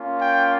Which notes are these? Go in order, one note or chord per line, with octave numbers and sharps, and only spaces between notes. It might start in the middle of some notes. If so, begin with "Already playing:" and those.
Already playing: A#3 C#4 F4
G5